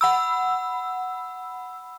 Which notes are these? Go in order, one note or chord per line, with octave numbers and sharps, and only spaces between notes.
F#5 B5 E6